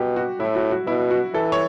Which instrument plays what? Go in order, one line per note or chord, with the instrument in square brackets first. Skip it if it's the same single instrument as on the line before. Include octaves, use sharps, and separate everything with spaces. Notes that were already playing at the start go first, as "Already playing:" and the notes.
Already playing: [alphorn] B2 [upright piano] G4
[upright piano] F#4
[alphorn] A2 [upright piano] E4
[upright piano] F#4
F#4
[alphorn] B2 [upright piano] E4
[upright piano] F#4
[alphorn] E3 [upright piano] A4
[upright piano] C#5